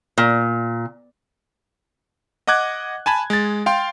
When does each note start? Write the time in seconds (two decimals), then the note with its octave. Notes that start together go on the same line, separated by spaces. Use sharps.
0.18 A#2
2.47 D#5 F#5 D6 F#6 G#6
3.06 G#5 A5 B5 G#6
3.30 G#3 A6
3.66 F5 G5 C6